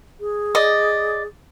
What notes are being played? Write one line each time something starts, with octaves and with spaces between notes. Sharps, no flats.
G#4
D5 D#5